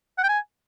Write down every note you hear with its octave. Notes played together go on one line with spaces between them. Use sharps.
F#5
G5
G#5